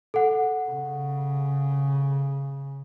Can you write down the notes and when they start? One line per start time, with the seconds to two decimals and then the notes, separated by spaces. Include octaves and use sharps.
0.14 A4 F#5
0.69 C#3